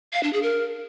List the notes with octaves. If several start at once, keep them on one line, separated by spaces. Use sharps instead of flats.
F5
D4
G#4
A#4